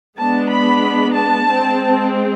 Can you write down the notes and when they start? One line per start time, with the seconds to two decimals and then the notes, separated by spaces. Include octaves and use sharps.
0.18 G#3 B3 D4 A5
0.50 B5
1.14 A5
1.47 G#3 C4